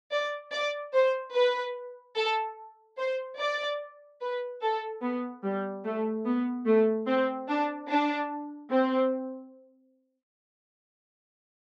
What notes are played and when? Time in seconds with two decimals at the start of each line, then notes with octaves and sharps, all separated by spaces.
0.11 D5
0.52 D5
0.93 C5
1.34 B4
2.16 A4
2.98 C5
3.39 D5
4.21 B4
4.62 A4
5.02 B3
5.43 G3
5.85 A3
6.26 B3
6.66 A3
7.07 C4
7.48 D4
7.89 D4
8.71 C4